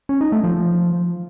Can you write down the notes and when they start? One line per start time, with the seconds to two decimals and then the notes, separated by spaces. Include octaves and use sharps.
0.09 C#4
0.21 D#4
0.32 A3
0.44 F3